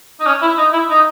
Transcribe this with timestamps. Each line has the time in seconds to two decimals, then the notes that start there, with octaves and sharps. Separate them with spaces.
0.20 D#4
0.26 C#4
0.42 E4
0.58 D#4
0.73 E4
0.90 D#4